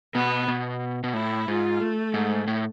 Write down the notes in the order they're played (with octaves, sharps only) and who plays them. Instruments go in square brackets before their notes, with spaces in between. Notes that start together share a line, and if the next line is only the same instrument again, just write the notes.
[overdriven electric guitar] B2 [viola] B3
[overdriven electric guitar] B2
B2
[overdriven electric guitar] A2 [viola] E4
[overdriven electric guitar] G#2 [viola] F4
[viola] A3
[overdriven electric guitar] G#2
A2